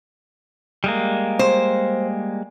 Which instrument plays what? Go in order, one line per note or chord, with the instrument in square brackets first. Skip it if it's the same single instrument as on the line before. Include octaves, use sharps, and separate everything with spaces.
[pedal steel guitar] G3 G#3 A#3
[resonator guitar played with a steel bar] C5